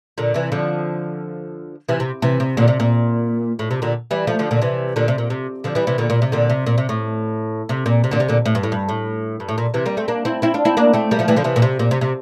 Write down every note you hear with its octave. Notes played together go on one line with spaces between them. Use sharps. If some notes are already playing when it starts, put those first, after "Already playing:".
A#2 D3
C3 E3
D3 F3
C3 E3
C3
C3 E3
C3
A#2 D3
C3
A#2
A2
C3
A#2 D3
E3 G3
F3 A3
D3 F3
A#2 D3
C3 E3
A#2 D3
C3
A#2
C3
D3 F3
E3 G3
C3 E3
A#2 D3
A#2
C3
A#2 D3
C3
A#2
C3
A2
C3
A#2
C3
A#2 D3
C3
A#2 D3
A2
G2
A2
G2
A2
G2
A2
A#2
C3 E3
G3 A#3
A3 C4
A#3 D4
C4 E4
C4 E4
D4 F4
C4 E4
A#3 D4
A3 C4
G3 A#3
F3 A3
E3 G3
D3 F3
C3 E3
A#2
C3
A#2
C3
C3